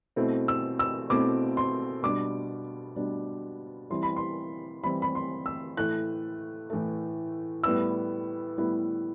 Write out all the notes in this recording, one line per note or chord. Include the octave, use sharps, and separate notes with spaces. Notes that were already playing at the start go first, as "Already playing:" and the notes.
B2 A3 C4 E4
E6
E6
B2 A3 C4 E4 D6
C6
B2 G3 D4 D6
B2 G3 D4
E3 G3 C4 E4 C6
B5
C6
E3 G3 C4 E4 B5
B5
C6
E6
A2 E3 A3 F#6
A2 E3 A3
A2 G3 B3 E4 E6
A2 G3 B3 E4